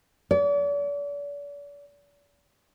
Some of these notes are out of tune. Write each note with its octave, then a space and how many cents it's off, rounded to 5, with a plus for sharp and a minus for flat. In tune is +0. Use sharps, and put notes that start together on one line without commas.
D5 -40